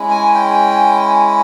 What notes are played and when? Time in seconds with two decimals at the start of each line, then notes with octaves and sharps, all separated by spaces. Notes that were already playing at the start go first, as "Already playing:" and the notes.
Already playing: G#3 C#4 E4
0.10 G#5
0.35 G5